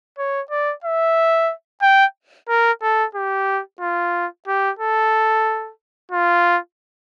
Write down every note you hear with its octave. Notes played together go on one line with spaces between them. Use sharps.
C#5
D5
E5
G5
A#4
A4
G4
F4
G4
A4
F4